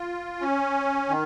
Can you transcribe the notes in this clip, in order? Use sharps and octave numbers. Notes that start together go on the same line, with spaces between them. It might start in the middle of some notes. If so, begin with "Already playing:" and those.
Already playing: F4
C#4
D#3